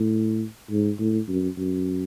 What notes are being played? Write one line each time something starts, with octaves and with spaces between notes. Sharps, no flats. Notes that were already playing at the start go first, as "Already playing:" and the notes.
Already playing: A2
G#2
A2
F#2
F#2